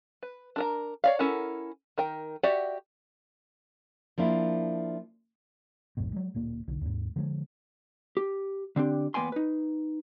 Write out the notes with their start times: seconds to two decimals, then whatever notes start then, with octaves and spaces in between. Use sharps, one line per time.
0.23 B4
0.56 D4 A#4 A#5
1.04 C#5 D5 F5
1.19 C#4 E4 A4 A#4 F#5
1.98 D#3 A#4 G5
2.43 F#4 G4 D5 E5 F#5
4.18 F3 A#3 D4 E4
5.97 A#1 F2 G#2 B2
6.13 F#3 G#3
6.34 D1 A#2 A#3
6.68 B1 D3
6.81 D#2 G#2
7.16 D3 F3 G3 G#3
8.17 G4
8.76 D3 C4 D4 G4
9.14 E2 A#3 B3 G5 G#5 C6
9.32 D#4 B4